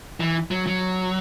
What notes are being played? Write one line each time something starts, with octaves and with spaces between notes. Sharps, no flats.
E3
F#3
F#3